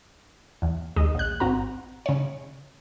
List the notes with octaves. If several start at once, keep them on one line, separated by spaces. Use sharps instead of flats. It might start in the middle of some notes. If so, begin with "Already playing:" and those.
E2
D#2 G#3 D#5
A#1 F#6
G#1 C4 F#4 A#5
C#3 C#5